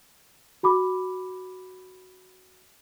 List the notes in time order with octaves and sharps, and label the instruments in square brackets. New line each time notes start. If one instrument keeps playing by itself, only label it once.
[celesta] F#4 B5 D6